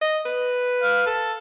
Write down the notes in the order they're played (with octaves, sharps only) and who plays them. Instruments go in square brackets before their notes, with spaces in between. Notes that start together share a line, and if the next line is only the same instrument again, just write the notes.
[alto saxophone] D#5
B4
[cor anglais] F5
A4